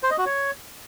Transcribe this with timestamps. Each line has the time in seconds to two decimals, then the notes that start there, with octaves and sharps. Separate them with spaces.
0.03 C5
0.11 D#5
0.18 F#4
0.26 C#5